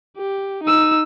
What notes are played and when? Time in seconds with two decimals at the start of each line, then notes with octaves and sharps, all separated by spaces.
0.17 G4
0.63 D#4 E6